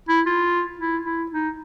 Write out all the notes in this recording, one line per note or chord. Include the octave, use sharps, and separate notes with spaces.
E4
F4
E4
E4
D#4